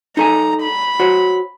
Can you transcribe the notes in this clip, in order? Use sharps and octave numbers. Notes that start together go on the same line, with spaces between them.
D#4 A4 G#5 A#5
B5
F#4 C5 C#5